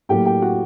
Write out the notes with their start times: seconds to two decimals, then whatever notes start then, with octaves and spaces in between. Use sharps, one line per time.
0.09 A2 F#3 A#3 G4 G5
0.26 G4 G5
0.42 F#4 F#5